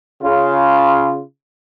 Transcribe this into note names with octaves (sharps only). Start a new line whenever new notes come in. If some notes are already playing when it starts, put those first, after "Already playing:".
C#3 F4